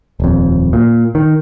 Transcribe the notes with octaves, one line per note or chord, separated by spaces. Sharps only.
D#1 F2
A#2
D#3